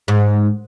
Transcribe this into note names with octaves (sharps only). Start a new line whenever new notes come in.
G#2